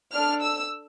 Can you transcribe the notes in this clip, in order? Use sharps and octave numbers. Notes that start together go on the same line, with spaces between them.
D4 A4 F6
E6